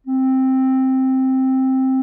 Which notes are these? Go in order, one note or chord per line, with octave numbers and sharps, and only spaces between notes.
C4